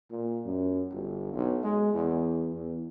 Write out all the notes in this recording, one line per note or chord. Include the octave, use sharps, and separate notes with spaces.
A#2
F#2
G1
B1
G#3
E2
E2